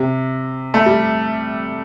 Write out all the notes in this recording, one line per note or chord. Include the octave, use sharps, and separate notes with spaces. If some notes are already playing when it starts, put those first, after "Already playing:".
Already playing: C3
A3
G3